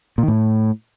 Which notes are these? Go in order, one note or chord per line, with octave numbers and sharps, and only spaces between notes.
A#2
D#3
A2